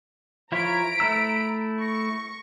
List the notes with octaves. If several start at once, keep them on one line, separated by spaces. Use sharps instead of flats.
F3 E4 C#5 A#5 B6 D7
A3 E4 E6
C#6 A#6